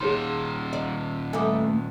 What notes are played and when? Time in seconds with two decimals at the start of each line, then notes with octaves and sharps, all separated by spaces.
0.01 A#2 D#3 G#4 C#5 C6
0.73 D5 D#5
1.33 G2 A3 G#5 D6 D#6